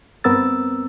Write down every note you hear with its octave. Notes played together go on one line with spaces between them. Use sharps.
G2 B3 C4 A#4 E6 A6